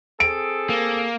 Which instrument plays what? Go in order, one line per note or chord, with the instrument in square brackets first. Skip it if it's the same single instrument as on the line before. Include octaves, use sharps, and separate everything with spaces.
[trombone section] C4 G#4 A4 [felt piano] D7
[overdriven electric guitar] A#3